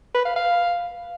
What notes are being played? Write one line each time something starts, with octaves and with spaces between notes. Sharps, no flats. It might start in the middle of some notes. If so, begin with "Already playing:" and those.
B4
F5
F5